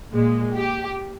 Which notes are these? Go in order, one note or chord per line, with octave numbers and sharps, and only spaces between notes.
A#2 G#3
G4